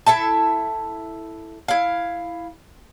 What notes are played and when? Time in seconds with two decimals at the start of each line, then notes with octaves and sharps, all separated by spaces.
0.06 E4 A4 E5 A5
1.68 E4 F5